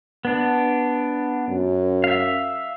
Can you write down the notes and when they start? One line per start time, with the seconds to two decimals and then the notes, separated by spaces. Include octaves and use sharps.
0.25 B3 D4
1.49 F#2
2.04 E5 F5